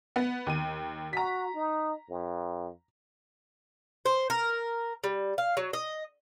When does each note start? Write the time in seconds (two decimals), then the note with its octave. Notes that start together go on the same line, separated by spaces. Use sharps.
0.16 B3
0.47 D#2 D#7
1.13 F#4 A#5 B6
1.54 D#4
2.10 F2
4.05 C5
4.30 A#4
5.04 G3
5.38 F5
5.57 F#3
5.73 D#5